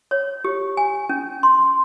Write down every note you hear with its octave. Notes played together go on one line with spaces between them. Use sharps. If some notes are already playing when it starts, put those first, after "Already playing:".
C#5
G4
G#5
C#4
C6